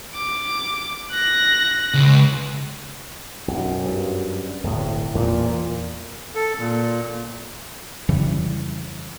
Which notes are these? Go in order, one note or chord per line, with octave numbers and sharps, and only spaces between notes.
D6
F#6 A#6
C#2
B1 F#2
G2
D1 G1 A2
E2 A#2 A#3
A4
A#2
F2 C#3 E3 G3